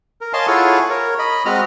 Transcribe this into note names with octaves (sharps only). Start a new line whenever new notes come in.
A#4
C#5 D#5 F5 G#5 A5 C6
E4 F4 G#4 A4 C#5 F#5
A#4 C#5
D#5 B5
G#3 C4 F#4 D#5 A#5 F6